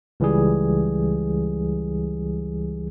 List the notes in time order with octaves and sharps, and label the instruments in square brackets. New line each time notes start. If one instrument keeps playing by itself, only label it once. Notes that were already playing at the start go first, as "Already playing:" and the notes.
[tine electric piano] C#2 E3 G3 G#4